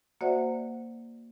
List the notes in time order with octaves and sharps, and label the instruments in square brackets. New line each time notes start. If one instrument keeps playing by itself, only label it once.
[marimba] A#3 F#4 C5 D5 E5 F#5